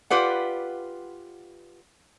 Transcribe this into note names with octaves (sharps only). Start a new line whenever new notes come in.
F4 G4 B4 D5 F#5